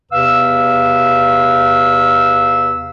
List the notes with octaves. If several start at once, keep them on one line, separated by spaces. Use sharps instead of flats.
E2 C3 B4 F5 E6